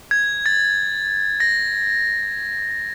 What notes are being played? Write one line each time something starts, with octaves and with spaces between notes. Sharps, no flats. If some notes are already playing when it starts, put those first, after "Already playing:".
G#6
A6
A#6